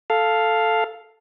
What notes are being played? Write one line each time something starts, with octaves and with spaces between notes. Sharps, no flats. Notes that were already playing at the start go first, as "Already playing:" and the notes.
A4 F5